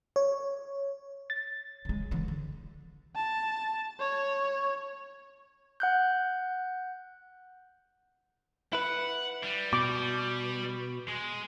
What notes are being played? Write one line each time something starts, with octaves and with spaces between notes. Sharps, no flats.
C#5
A6
C#3 G#3
C#3 E3
D3
A5
C#5
F#5 F#6 G6
E4 B4 F#5
G3
B2 D6
G#3